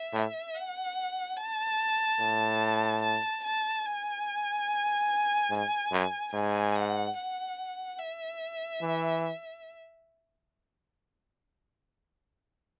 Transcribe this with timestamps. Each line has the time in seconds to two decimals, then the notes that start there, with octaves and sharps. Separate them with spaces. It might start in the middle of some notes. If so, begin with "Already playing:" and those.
Already playing: E5
0.13 A2
0.54 F#5
1.37 A5
2.20 A2
3.02 A5
3.44 A5
3.85 G#5
5.50 G#2
5.92 F#2
6.33 G#2 G#5
6.75 F#5
7.17 F#5
7.99 E5
8.81 E3